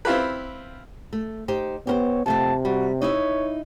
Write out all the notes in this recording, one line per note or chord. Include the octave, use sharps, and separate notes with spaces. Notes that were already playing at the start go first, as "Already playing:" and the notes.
C4 E4 F4 G4 B4
A3
D#4 G4 C5
B3 G4 A#4 C5 C#5
F2 C3 A3 C4 A5
G3 F#4
D#4 E4 C#5 E5